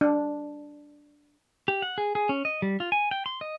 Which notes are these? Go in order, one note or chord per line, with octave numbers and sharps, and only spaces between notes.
D4
G4
F#5
G#4
G#4
C#4
D#5
G3
F4
G#5
G5
C6
D#5